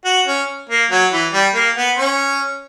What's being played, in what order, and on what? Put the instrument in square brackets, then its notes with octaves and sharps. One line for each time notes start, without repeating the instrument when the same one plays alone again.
[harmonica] F#4
C#4
A#3
F#3
E3
G3
A#3
B3
C#4